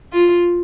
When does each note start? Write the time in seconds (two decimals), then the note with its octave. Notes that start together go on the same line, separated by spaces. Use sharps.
0.12 F4